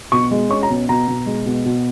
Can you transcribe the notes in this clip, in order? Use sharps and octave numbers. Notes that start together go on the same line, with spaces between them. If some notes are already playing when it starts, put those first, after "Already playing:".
B2 C#6
G#3
C#4 C#6
A#5
B2
B2 A#5
B2
G#3
B2
B2